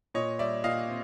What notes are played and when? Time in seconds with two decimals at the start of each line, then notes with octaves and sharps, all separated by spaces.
0.14 A#2 C#5 D#5
0.39 G3 D5 E5
0.64 A#2 D#5 F5
0.88 C4